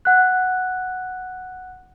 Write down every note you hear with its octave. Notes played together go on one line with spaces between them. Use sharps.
F#5 F#6